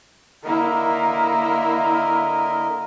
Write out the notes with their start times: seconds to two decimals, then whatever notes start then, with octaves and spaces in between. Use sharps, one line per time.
0.44 D3 A#3 E4 A#4 D#5